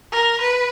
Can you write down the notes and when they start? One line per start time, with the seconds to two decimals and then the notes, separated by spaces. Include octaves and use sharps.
0.12 A#4
0.41 B4